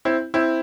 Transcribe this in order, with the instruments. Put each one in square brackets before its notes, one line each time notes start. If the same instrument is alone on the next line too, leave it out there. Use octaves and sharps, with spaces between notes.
[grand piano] C4 E4
C4 E4